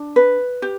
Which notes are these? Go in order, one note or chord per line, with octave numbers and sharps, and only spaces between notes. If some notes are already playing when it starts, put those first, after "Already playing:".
Already playing: D4
B4
G4